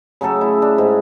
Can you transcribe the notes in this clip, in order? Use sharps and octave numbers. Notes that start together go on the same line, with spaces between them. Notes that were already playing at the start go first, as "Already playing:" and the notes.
C#3 F#3 A3 A4
E4
D4
G#2